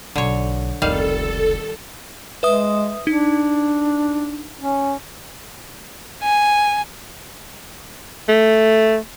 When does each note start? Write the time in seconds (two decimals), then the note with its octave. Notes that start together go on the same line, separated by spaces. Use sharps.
0.16 B1 D3 C#5
0.82 F1 C#2 D#3 G3 A4 F5
2.43 G#3 B4 E5 D#6
3.07 D4 D#4
4.61 C#4
6.22 G#5
8.29 A3